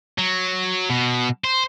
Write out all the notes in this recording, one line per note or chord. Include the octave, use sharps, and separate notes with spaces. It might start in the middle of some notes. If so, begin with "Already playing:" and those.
F#3
B2
C5